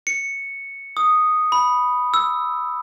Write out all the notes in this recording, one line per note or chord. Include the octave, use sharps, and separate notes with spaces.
C#7
D#6
B5
E6